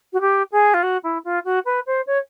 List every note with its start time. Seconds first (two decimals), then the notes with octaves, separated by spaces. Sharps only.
0.13 F#4
0.21 G4
0.52 G#4
0.74 F4
0.83 F#4
1.03 E4
1.24 F4
1.45 F#4
1.65 B4
1.86 C5
2.07 C#5